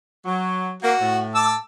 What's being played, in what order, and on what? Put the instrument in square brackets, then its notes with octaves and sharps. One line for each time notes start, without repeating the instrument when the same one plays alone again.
[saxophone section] F#3
[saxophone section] A#3 [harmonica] F#4
[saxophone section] A2
[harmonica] A5 D6 E6